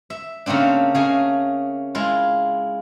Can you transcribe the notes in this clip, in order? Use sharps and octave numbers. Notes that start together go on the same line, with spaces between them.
E5
C#3 A3 A#3 C4 D4
C#3 A3 A#3 G#4 D#5
G#3 E4 F4